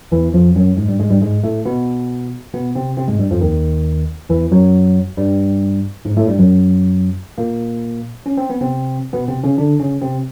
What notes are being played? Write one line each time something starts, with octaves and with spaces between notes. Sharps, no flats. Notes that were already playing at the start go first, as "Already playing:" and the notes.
E2 E3
F2 F3
F#2 F#3
G#2 G#3
G2 G3
G#2 G#3
G2 G3
G#2 G#3
A2 A3
B2 B3
B2 B3
C3 C4
C3 C4
G#2 G#3
G2 G3
F2 F3
D#2 D#3
E2 E3
F#2 F#3
G2 G3
G#2 G#3
A2 A3
G2 G3
F#2 F#3
A#2 A#3
C#4
C4
B3
C3 C4
B2 B3
C3 C4
C#3 C#4
D3 D4
C#3 C#4
C3 C4